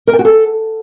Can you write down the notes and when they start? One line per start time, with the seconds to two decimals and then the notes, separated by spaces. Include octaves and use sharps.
0.07 A#4
0.13 G5
0.19 F#4
0.25 A4